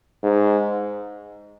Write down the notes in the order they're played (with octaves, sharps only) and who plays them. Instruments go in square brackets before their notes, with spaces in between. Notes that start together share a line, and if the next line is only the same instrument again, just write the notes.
[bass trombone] G#2